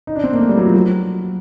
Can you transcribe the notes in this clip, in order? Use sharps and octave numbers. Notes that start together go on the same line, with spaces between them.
D#4
D4
C4
A#3
A3
G3
F#3
F3
F#3